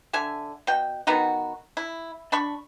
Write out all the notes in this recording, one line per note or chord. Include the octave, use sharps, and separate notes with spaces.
D3 E5 G#5
B2 G5
D#3 B3 D#4 F#4
E4
D4 B5 C#6